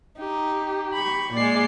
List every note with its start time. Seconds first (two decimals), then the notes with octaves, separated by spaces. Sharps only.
0.18 D#4 G4
0.93 B5 C#6
1.33 A#2 G#3 D5 C7